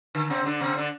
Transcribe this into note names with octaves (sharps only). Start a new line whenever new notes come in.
D3
C3 C4
D3 D4
C3 C4
D3 D4